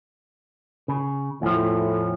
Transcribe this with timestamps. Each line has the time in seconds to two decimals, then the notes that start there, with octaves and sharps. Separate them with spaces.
0.88 C#3
1.42 E2 A2 F3